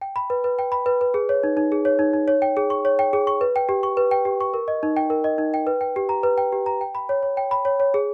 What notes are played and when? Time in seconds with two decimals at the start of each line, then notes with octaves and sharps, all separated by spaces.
0.01 G5
0.16 B5
0.30 B4
0.44 B4
0.59 G5
0.72 B5
0.86 B4
1.01 B4
1.14 G#4
1.29 C#5
1.43 D#4
1.57 D#4
1.72 G#4
1.85 C#5
1.99 D#4
2.14 D#4
2.28 C#5
2.42 G5
2.57 G#4
2.70 C#6
2.85 C#5
2.99 G5
3.13 G#4
3.27 C#6
3.41 B4
3.56 G5
3.69 G4
3.83 C#6
3.97 B4
4.11 G5
4.25 G4
4.41 C#6
4.54 A#4
4.68 D#5
4.83 D#4
4.97 G5
5.10 A#4
5.24 D#5
5.38 D#4
5.54 G5
5.67 B4
5.81 G5
5.96 G4
6.09 A#5
6.23 B4
6.38 G5
6.52 G4
6.66 A#5
6.81 G5
6.95 B5
7.09 C#5
7.23 C#5
7.37 G5
7.51 B5
7.65 C#5
7.80 C#5
7.94 G#4